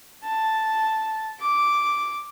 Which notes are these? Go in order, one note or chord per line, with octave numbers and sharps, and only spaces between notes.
A5
D6